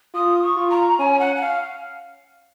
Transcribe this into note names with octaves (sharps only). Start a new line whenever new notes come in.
F4 D#6
C#6
F4
A#5
C#4 G#5
F#5
F#5
F5